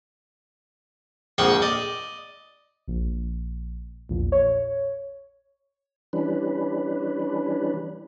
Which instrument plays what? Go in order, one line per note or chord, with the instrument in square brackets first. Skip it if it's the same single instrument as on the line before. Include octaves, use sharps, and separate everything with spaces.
[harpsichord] A#1 F2 G#3 F#5 G5 C#6
D5 D#5
[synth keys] A#1
A#1 E2 A#2
C#5
[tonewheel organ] E3 G3 C#4 D4 B4